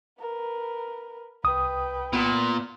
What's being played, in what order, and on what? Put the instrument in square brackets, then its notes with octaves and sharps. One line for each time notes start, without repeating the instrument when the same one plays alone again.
[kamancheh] A#4 B4
[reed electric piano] C2 D#6 [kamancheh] B4 G5
[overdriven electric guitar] A#2 [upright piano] B3